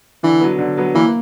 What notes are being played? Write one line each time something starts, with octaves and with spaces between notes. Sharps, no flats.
D3 E3
F#3 B3
D3
F#3 B3
E3 A#3